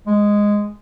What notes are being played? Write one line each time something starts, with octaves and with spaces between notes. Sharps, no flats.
G#3